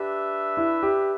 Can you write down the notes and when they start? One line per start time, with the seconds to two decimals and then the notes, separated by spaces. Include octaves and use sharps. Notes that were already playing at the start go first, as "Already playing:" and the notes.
Already playing: D4 G4 B4 E5
0.57 E4
0.83 G4